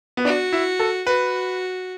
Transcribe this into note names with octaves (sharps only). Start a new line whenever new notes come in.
B3
D4 F#4
E4
A4
F#4 B4